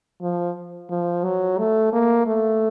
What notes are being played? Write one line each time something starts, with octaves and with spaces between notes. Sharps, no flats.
F3
F3
F#3
A3
A#3
A3